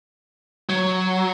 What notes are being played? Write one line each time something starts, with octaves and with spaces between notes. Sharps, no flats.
F#3